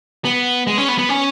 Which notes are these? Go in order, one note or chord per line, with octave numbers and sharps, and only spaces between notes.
B3
G#3
C#4
B3
B3
C#4